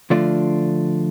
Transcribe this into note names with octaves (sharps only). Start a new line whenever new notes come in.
D3 F3 A3 D4 F4